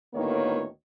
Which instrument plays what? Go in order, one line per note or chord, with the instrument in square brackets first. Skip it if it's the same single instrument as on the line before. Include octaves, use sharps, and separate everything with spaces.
[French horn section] D2 A2 D#3 A#3 B3 C#5